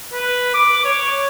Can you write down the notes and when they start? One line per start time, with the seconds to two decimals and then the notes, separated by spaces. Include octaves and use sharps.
0.13 B4
0.54 D6
0.85 C#5